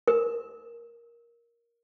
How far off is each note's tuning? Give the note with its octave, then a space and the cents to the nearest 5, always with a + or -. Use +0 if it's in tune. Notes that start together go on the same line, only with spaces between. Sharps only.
A#4 +10